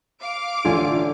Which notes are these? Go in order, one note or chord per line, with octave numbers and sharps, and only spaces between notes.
F5 D6 D7
A1 D3 F4 G#5